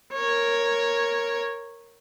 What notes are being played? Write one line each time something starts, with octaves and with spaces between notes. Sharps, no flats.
A#4 C#5